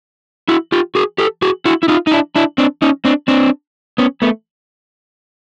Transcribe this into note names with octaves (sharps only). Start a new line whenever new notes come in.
E4 F#4
F4 G4
F#4 G#4
G4 A4
F#4 G#4
E4 F#4
E4
D#4 F4
D#4
D4 E4
D4 E4
C4 D4
C#4 D#4
C4 D4
C4 D4
B3 C#4
A3 B3